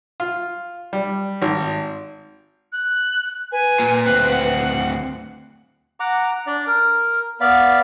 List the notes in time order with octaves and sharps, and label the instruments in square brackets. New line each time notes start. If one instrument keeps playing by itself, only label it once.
[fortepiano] F4
G3
G#1
[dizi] F#6
[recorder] B4 [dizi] G#5
[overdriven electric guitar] A#2
[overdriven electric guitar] D2 C4 [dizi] F#6
[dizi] F#5
[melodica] F#5 A#5 D6
D4 D5
A#4
B3 D5 F5 B5